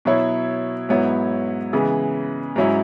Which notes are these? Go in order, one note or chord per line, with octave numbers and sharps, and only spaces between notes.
B2 F#3 E4 C#5
G#2 F#3 B3 E4 C#5
C#3 E3 G#3 B3
G#2 F#3 C#4 E4